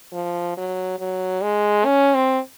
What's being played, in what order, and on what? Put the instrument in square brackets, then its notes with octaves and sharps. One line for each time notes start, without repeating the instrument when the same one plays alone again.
[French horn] F3
F#3
F#3
G#3
C#4
C4